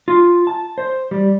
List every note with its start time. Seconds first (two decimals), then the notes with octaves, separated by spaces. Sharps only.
0.08 F4
0.47 A5
0.78 C5
1.11 G3